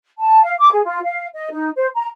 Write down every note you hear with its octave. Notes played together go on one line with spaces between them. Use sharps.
A5
F5
D6
G#4
F4
F5
D#5
D#4
C5
A#5